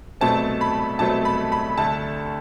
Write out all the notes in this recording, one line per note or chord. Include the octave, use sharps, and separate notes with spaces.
C2 B2 F#3 A3 C4 A5
B5
C2 B2 F#3 A3 C4 A5
B5
B5
D2 D3 A3 A5